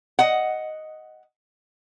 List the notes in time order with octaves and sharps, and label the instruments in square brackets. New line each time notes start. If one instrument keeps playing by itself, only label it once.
[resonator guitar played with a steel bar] D#5 F#5